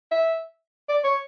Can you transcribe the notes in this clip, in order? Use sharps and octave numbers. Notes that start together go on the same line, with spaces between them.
E5
D5
C#5